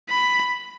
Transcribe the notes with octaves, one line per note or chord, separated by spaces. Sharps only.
B5